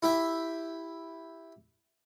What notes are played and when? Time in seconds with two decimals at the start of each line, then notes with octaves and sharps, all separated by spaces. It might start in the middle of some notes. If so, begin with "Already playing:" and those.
0.03 E4 G4 E5